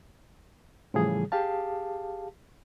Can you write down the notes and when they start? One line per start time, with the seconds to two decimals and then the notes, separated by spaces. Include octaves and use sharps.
0.94 A2 C#3 E3 F3 G3 G#4
1.32 G4 G#4 F5 A5